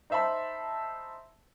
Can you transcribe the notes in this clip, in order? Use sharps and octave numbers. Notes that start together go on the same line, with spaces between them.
D#4 C5 E5 A5 B5